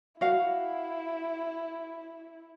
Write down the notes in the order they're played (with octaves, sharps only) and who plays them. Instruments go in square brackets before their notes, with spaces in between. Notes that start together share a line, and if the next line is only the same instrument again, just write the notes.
[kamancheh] E4 [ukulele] F#4 F5